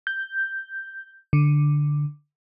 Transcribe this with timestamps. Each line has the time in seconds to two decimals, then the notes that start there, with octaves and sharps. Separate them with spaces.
0.07 G6
1.33 D3